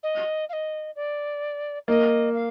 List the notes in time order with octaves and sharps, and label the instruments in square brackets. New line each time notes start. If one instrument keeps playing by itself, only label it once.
[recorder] D#5
F5
D#5
D5
[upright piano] A#3 [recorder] D#5
[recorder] F5